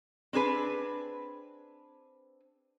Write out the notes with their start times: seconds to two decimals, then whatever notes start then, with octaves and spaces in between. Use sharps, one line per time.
0.33 C4 D4 G#4 B4